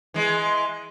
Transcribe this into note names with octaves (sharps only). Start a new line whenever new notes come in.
E3 G#3